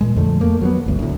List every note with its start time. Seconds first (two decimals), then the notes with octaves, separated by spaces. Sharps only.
0.01 A#2 G#3
0.17 F2 D3 A3
0.41 A3 A#3
0.61 F#3 G3 B3
0.86 G1 D2
0.99 D2 A2